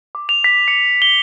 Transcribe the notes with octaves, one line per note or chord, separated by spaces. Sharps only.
D6
F7
B6
C#7
G7